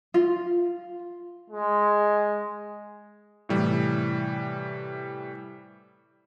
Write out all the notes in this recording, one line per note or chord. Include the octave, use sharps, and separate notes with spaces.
F4
G#3
A2 C3 E3 G3